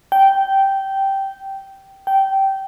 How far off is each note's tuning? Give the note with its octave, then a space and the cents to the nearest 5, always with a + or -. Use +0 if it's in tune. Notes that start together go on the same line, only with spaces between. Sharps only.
G5 -10
G5 -15